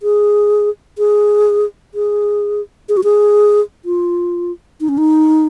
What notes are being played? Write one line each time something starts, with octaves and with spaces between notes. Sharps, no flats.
G#4
G#4
G#4
G#4
F#4
G#4
F4
D#4
C#4
D#4